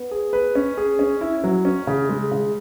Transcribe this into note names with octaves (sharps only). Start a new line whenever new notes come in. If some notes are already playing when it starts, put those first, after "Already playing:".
Already playing: B3
G#4
B4
C#4
G#4
C#4
E4
F#3
C#4
C#3
G#3
C#3